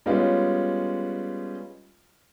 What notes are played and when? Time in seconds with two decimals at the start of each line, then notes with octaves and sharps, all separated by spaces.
0.06 G3 G#3 B3 C#4 F4